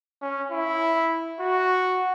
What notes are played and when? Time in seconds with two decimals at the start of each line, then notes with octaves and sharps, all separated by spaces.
0.22 C#4
0.51 E4
1.40 F#4